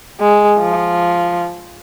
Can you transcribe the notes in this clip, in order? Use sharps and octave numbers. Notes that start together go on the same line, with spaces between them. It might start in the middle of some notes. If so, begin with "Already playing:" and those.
G#3
F3